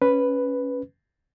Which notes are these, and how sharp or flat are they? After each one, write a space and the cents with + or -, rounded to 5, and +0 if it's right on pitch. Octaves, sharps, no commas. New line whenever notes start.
C#4 +0 B4 +0